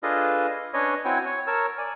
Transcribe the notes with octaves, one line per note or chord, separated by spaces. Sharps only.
D4 F4 G#4 A4 B4 D#5
C#4 D4 B4 C#5 D#5
C4 E4 F#4 C#5 G5 G#5
C#5
A#4 C#5 A5 E6
D5 G#5